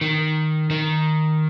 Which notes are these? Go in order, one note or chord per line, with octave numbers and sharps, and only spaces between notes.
D#3
D#3